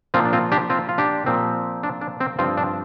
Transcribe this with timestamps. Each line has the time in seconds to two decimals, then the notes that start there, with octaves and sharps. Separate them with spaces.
0.14 A#2 F3 C4 F4
0.25 D4
0.33 C4 F4
0.52 D4 G4
0.70 C4 F4
0.89 F4
0.98 D4 G4
1.26 A#2 F3 C4
1.83 D4
2.01 D4
2.20 C4
2.39 G2 F3 C4 F4
2.57 D4